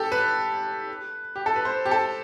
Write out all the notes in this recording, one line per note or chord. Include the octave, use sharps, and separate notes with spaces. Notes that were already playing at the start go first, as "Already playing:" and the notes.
Already playing: G4 A4
B4
G4
A4
B4
C5
G4
A4